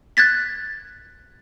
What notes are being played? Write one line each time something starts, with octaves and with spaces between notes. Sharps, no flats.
F#6 G#6 A6 B6